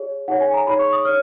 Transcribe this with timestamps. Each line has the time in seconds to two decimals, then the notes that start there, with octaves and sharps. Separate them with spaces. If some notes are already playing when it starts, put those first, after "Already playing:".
Already playing: G#4 C#5
0.28 D#4 G#4 C#5 F#5
0.41 G#5
0.54 A#5
0.67 D#4 G#4 C#5 B5
0.79 C#6
0.93 D#6
1.05 C#5 F6